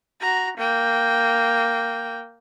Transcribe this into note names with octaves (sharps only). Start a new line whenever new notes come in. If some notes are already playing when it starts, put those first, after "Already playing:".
F#4 A#5
A#3 G5